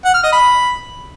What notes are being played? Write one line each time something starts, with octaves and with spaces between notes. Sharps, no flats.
F#5
F6
D#5
B5